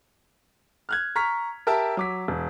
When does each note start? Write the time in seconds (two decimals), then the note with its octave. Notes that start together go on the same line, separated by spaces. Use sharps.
0.89 F6 F#6 G#6
1.16 A#5 C#6 F6 B6
1.67 G4 A#4 E5 A5 E6
1.97 F#3 D6 B6
2.28 E1